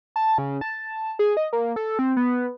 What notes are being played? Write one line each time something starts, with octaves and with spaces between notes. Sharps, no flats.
A5
C#3
A5
G#4
D#5
A#3
A4
C4
B3